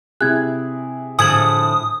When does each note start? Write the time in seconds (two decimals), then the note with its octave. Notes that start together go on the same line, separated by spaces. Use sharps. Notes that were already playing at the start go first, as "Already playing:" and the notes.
0.21 C3 E4 G#4 F#6 G#6
1.19 A2 D3 F3 G#5 D#6 G#6 F#7